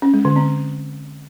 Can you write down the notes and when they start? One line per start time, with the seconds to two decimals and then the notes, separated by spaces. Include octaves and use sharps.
0.02 C#4
0.14 G#3
0.25 D3
0.36 C4